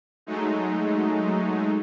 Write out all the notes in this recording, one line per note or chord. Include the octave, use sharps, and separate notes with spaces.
F#3 G#3 A3 D#4